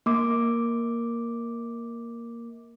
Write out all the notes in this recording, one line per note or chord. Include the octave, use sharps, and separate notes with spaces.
A#3 D6